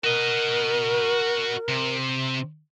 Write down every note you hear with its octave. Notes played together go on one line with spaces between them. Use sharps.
F#4 A#4 D#5
C3